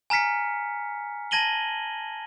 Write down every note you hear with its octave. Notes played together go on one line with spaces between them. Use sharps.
G#5 A#5 F6 B6 C#7
A5 G#6 A#6 D#7 F#7 G7